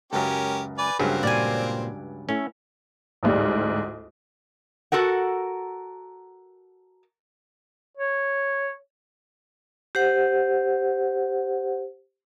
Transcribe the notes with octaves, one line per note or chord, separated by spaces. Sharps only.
C#2 F#2 C#4 G4 A#4
B4 D5 G#5
C#2 G2 F#3 A#3 C4 G#4
A#2 G4 D5 G#5
A3 C#4 E4
A1 D2 G#2 G3
F#4 A4 A#4 F#5
C#5
G4 C5 F#5